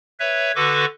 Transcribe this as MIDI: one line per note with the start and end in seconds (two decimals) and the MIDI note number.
0.20 0.52 71
0.20 0.52 73
0.20 0.52 76
0.56 0.85 50
0.56 0.85 66
0.56 0.85 69
0.56 0.85 71
0.56 0.85 85
0.56 0.85 86